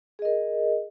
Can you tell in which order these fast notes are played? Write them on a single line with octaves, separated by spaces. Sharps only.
G#4 D#5 A#4